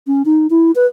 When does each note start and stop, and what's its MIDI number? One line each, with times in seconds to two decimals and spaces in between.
0.07 0.22 61
0.25 0.47 63
0.50 0.71 64
0.75 0.86 71